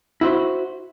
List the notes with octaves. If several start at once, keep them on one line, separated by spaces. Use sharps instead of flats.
E4 F#4 C5